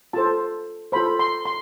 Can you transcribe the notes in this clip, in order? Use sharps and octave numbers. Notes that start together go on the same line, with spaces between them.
F4 A4 C5 A5
F4 A4 C5 B5
C6
C6